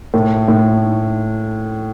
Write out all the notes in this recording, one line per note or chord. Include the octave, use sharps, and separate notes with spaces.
A2
A2